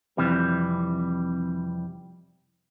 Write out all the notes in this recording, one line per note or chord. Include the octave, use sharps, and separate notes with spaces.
F2 C3 E3 G3